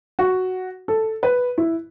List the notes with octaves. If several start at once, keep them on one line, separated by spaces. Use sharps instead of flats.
F#4
A4
B4
E4